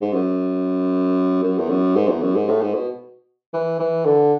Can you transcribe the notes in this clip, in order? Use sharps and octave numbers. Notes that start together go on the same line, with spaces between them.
G#2
F#2
F#2
E2
F#2
G#2
E2
F#2
G#2
A2
G#2
B2
E3
E3
D3